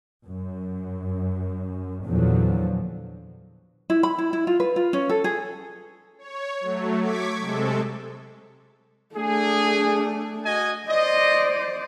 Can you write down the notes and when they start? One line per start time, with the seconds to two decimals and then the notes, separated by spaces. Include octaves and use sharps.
0.28 F#2
2.07 E2 A#2 D3 F3 F#3
3.90 E4
4.03 B5
4.18 E4
4.33 E4
4.47 F4
4.60 B4
4.76 F4
4.93 C#4
5.10 A4
5.24 G#4
6.18 C#5
6.61 F#3 A3
7.01 C#6 D6 G#6 B6
7.39 C3 G#3 A4
9.15 A3 D4 G#4
10.45 F#4 D#5 G#5
10.88 C5 D5 D#5